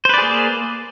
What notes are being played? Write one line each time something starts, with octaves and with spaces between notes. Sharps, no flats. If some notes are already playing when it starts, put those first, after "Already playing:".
A#3 G#4 B4 C5 D5